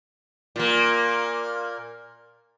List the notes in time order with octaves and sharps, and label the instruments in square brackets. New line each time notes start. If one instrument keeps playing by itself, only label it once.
[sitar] A#2 A#3